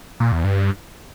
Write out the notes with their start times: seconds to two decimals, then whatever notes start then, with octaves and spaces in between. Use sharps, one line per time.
0.20 A#2
0.32 E2
0.44 G2